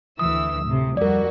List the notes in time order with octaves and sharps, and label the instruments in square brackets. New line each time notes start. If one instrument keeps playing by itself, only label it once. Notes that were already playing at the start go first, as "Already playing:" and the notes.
[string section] D2 E3 E6 [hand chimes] D#6
[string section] A2 C3
[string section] F2 G3 F#4 [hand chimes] A#4 D5